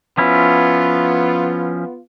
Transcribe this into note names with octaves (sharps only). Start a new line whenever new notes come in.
F3 B3 C#4 E4 F4